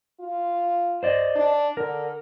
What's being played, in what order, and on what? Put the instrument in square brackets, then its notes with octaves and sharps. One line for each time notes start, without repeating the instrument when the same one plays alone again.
[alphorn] F4
[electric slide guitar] C5 D5 D#5
[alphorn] D4
[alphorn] D3 [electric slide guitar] A#4